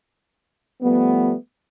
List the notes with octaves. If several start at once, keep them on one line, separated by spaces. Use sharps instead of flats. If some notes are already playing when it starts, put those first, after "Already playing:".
F3 G3 A3 B3